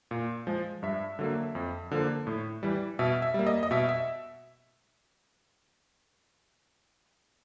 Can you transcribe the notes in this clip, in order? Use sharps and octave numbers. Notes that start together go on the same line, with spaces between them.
A#2
F3 G#3
G2 E5
D3 F#3 A#3
F2
D3 F3 A#3
A2
E3 G3
B2 E5
E5
G3 A#3
D#5
D#5
B2 E5
E5